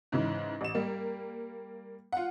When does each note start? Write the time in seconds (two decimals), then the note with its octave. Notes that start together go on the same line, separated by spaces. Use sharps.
0.12 G#2 C#3 E3
0.61 A1 E7
0.75 G3 A#3
2.13 F4 F#5